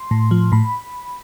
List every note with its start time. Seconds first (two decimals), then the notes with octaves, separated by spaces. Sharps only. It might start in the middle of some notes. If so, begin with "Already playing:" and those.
Already playing: C6
0.11 A2
0.31 F3
0.52 A2 B5